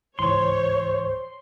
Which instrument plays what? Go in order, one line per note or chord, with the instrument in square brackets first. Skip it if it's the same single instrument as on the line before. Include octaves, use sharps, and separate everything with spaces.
[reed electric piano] C#2 G#2 E3 [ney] C5 [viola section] C#5 [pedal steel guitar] C6